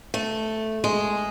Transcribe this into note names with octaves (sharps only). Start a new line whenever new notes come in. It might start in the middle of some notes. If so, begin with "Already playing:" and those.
A3
G#3